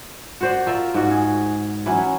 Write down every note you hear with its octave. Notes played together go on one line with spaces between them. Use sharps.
F#4 C5 D5
F4 A#4 D5 E5
G#2 F#4
G#4
E3 F#3 C#4